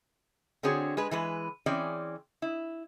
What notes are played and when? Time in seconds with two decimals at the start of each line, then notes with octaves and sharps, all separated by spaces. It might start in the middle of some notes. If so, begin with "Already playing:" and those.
0.63 D3 C4 F#4 G#4 C#5
0.97 G#3 G#4 B4
1.11 E3 G#3 B4
1.66 E3 C4 C#4 G#4 D5
2.42 E4